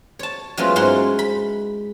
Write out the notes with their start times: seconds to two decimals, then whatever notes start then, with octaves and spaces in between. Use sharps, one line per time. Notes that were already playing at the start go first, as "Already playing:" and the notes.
0.19 C#5 A5
0.57 F#3 G#3 A3 B3 C#4 F4
0.76 G#2 E4 C5 F5 F#5 C6
1.19 B5